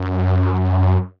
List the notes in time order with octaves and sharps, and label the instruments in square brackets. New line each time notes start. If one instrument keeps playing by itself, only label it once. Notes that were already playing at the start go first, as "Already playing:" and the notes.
Already playing: [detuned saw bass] F#2